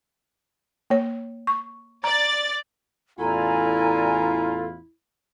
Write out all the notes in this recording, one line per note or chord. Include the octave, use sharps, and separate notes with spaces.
A#3 C#5
C#6
D5 A#5 A6
A1 E2 E4 F4 A4 D5 G#5 A#5